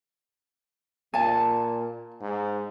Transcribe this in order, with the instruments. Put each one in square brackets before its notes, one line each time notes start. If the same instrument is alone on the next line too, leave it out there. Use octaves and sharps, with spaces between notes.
[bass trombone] A#2 [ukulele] G#5 A5
[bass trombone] G#2